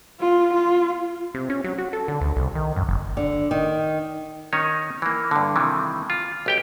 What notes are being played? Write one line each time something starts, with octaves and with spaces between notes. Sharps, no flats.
F4
F4
C3
C#4
F#3
F#4
A4
D3
D2
C2
D#3
F#2
F#1
D3
D#3
D#3 C#4 D#4 C#5
E3 A#3
G2 D3
C3 D#3 E3 G3
F4
B1 G4 G5